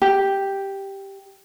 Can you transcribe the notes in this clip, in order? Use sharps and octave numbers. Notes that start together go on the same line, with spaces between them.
G4